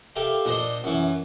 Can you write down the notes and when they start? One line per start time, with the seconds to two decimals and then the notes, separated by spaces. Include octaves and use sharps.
0.16 G4 A4 A#4 E5 F5
0.45 A#2 D4 C5 D#5
0.84 F#2 E3